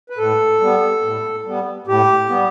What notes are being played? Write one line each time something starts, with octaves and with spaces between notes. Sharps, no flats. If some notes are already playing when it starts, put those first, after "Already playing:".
B4
A2 A4
G3 B3
A2
G3 B3
A2 G4
G3 B3